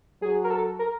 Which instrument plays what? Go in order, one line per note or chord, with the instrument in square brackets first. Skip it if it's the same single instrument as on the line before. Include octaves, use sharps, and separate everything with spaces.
[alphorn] F#3 [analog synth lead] G#4
[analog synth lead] A#4
A4
A#4